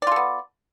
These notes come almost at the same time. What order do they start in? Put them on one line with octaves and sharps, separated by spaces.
D5 F4 A4 B3